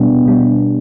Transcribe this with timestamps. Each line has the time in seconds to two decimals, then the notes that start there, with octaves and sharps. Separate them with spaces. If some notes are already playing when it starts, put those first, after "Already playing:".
Already playing: B2 G3 B3 D4
0.26 B2 G3